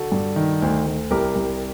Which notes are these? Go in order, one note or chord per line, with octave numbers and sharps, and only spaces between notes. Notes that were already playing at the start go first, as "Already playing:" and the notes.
Already playing: D3 F#4 A4
G2
D#3
D2
D2
C2 G4 A#4
C2